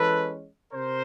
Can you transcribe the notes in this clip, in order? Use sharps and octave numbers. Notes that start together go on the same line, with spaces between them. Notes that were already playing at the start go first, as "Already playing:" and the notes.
Already playing: E3 G#3 C#4 A4 B4
C3 A#4 C5